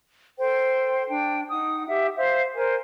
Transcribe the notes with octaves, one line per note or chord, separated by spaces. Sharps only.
A4 C5 G5
D4 G5
D#4 F#5 D#6
G4 E5 F#5
C5 E5 F5
A#4 C5 G#5